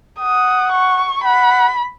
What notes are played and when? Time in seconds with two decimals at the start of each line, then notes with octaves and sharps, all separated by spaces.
0.19 F#5 D#6
0.72 C#6
1.23 F#5 B5